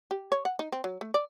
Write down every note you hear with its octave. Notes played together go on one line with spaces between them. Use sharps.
G4
C#5
F#5
D#4
C4
F#3
A3
D5